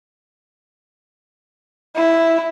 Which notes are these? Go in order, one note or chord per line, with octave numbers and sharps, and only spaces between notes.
E4